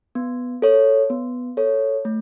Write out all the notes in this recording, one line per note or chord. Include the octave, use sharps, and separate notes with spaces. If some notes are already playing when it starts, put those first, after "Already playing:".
B3
A4 C#5
B3
A4 C#5
A3